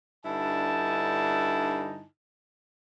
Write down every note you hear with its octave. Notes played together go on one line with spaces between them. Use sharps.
G2 D3 D#4 E4 G#5 A5